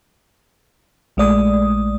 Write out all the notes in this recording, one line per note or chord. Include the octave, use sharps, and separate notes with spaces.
A#1 G#3 A3 D5 D#6